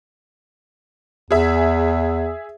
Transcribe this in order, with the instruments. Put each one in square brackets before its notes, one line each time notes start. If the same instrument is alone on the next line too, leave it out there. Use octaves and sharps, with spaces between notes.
[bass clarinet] E2 [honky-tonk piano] G#4 E5